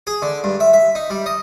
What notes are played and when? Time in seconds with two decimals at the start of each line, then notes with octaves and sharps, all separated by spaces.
0.07 G#4
0.22 D3
0.44 G2
0.60 E5
0.73 E5
0.95 D#4
1.10 G3
1.26 D#5